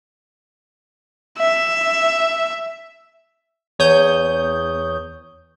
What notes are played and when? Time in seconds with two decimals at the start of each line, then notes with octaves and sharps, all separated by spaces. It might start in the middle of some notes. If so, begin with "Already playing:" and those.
1.39 E5
3.79 E2 C#5 D#6 G6